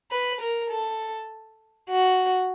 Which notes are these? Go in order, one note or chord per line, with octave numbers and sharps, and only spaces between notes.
B4
A#4
A4
F#4